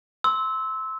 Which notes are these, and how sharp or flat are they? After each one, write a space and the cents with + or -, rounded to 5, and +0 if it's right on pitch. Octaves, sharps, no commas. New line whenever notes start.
C6 +0 E6 -20